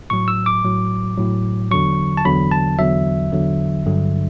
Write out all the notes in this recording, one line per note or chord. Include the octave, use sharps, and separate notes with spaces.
A2 F#3 C#6
E6
D6
A2 F#3
A2 F#3
E2 D3 F#3 C#6
A5
E2 D3 F#3 B5
A5
E2 D3 F#3 E5
E2 D3 F#3
G2 D3 F#3